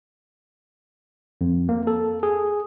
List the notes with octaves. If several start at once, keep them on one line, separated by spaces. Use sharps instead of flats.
F2
A#3
A4
G#4